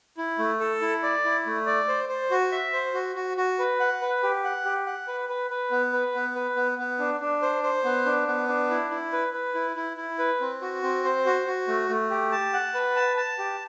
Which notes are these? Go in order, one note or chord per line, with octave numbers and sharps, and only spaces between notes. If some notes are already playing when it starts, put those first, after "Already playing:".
E4
A3
A4
E4
D5
E4
A3
D5
C5
C5
F#4
E5
C5
F#4
F#4
F#4
B4
F#5
B4
G4
F#5
G4
F#5
B4
B4
B4
B3
B4
B3
B4
B3
B3
D4
D4
C5
C5
B3
D4
B3
D4
E4
E4
B4
B4
E4
E4
E4
B4
C4
F#4
C4
C5
F#4
F#4
A3
A3
G4
A5
F#5
B4
A5
A5
G4